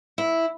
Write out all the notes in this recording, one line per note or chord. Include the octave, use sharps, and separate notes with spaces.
E4